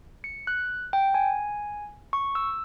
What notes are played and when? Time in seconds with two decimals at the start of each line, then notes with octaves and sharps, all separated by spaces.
0.24 C#7
0.47 F#6
0.93 G5
1.14 G#5
2.13 C#6
2.35 E6